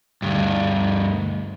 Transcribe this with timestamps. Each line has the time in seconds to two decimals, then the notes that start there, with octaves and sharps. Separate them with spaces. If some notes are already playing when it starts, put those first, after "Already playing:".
0.22 D2 G2